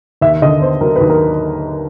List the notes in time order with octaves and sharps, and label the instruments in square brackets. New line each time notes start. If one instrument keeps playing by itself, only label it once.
[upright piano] D#2 E5
D3 D#5
B3 C5
F#3 A#4
B4
D#2
A#4